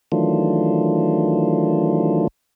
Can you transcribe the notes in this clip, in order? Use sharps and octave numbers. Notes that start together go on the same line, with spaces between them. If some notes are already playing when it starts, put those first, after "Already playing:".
D#3 E3 F#3 A3 D4 F4